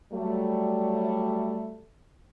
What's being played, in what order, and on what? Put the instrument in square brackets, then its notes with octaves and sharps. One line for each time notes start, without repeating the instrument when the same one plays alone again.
[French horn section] F#3 G3 A3